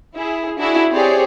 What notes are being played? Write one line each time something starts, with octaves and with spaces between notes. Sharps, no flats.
E4 G#4
D4 E4 F#4 G#4
C4 G4 G#4 C#5 D5